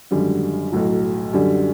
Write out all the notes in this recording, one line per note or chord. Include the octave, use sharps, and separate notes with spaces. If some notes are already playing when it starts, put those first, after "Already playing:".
G#1 F#2 D3 G3
B1 A2 F#3
F#2 D3 G3